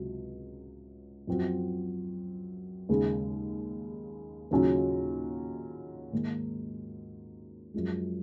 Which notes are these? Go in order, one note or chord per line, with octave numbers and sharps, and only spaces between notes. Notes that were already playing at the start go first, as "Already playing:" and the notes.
Already playing: C#2 C3 F#3
F#2 F3 C4 F#4
D#2 C#3 G#3
D#2 C#3 F#3 C#4 F4
G#2 D#3 A#3
F#2 F3 G#3